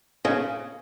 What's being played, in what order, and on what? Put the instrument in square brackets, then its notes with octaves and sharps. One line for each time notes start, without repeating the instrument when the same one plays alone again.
[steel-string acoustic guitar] C#3